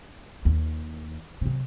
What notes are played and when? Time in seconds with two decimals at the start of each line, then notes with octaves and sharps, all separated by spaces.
0.45 D#2
1.41 C3 F#3